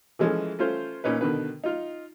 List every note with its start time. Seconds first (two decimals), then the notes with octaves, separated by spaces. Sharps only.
0.19 E3 F3 G#3 A3 C#4
0.59 A3 C#4 F4 C5
1.04 A#2 C#4 D#4 B4
1.21 B2 D3 D#3 B4
1.64 D#4 F4